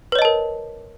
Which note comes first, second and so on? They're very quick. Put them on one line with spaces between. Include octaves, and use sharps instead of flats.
B4 C#5 D#5 A5 A#4